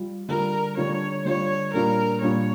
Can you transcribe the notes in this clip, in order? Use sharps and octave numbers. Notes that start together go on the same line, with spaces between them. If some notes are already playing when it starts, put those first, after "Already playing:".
Already playing: G3 F4
D3 G3 D4 F4 A#4
D3 G3 D4 F4 C#5
D3 G3 D4 F4 C#5
A#2 G3 D4 F4 A#4
A#2 G3 D4 F4 C#5